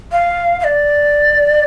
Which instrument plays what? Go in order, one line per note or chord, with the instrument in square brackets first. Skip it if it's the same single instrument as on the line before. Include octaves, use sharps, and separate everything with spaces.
[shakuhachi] F5
F5
D5